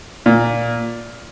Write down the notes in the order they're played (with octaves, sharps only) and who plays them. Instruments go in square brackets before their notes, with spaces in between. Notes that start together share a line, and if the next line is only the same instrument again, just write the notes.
[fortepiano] A#2